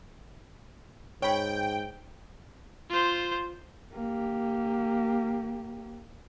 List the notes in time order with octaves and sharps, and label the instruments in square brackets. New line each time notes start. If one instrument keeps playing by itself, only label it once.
[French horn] G#2 [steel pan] C#5 B5 [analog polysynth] G5
[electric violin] F4 C5
[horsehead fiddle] A#3 G4